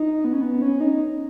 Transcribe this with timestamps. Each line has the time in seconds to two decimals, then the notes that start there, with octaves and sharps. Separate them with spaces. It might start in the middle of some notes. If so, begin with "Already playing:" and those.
Already playing: D#4
0.24 B3
0.33 C#4
0.41 B3
0.62 C#4
0.81 D#4